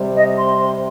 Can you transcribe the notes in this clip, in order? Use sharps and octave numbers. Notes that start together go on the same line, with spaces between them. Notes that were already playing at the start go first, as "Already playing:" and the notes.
Already playing: C3 G3
D#5
C6